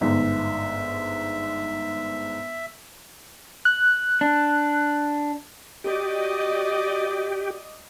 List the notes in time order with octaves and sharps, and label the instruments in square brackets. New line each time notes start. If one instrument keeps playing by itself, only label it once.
[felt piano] G1 G#2 [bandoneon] E5
[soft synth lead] F#6
[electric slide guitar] D4
[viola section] F#4 D5 D#5 [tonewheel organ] G4